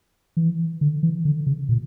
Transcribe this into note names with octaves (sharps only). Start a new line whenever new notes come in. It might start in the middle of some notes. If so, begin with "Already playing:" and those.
E3
D3
E3
D3
C#3
A#2